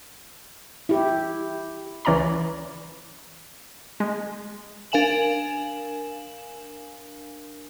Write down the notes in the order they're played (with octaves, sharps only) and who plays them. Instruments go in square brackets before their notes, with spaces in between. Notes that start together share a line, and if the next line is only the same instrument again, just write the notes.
[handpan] E4 G4
[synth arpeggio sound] C#2 E3 C#4 D5 A#5 B5
G#3
[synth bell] D4 A#4 F5 G#5 E7 F#7